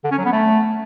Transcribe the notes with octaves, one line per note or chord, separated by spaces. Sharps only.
D3
C#4
F#3
B3
A3